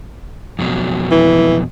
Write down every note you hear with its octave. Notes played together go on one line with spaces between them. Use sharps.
F2 B2 F#3
E3